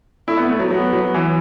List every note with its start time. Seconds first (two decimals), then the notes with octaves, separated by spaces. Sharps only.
0.28 A3 E4
0.37 B3
0.49 A3
0.59 F#3
0.70 F#3 B3
0.93 F#3
1.14 E3